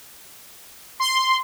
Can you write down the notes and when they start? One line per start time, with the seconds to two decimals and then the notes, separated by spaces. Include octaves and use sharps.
1.00 C6